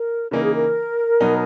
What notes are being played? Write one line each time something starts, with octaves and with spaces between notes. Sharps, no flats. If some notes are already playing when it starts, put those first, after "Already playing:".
Already playing: A#4
C#3 E3 A#3 D#4 A#4
G#4
A#4
B2 F#3 B3 D#4